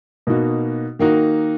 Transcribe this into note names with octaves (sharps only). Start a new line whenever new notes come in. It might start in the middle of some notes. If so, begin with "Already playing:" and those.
B2 A#3 D#4 F#4
D#3 A#3 D#4 F#4